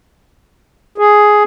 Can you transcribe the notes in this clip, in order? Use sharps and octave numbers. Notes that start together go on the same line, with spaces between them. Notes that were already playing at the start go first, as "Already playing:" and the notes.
G#4